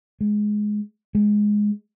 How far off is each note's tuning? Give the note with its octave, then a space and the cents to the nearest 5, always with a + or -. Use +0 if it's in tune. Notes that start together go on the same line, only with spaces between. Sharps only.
G#3 +10
G#3 +0